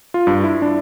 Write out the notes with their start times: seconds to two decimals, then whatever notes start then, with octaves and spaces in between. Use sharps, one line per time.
0.14 F4
0.27 G2
0.44 E4
0.62 D4